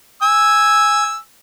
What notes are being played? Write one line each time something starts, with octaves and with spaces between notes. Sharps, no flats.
G#5 E6